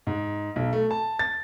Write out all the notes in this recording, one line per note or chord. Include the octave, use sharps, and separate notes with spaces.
G#2
B1
A3
A5
A6